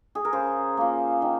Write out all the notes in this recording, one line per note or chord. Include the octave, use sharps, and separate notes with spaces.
G#4
A#4
C#3 C5
F3 A#3
D#3